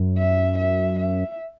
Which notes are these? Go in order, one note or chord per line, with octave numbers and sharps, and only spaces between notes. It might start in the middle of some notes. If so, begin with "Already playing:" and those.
Already playing: F#2
E5
E5
E5